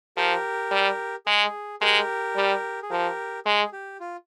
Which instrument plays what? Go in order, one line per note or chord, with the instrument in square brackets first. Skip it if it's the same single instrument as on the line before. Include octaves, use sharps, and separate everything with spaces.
[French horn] F3 [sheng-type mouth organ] G4 A#4
[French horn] G3
[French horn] G#3 [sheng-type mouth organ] G#4
[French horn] G#3 [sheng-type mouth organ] G4 A#4
[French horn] G3
[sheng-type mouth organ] G#4
[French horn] F3 [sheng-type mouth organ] G4 A#4
[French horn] G#3 [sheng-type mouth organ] G#4
[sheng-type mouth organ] G4
F4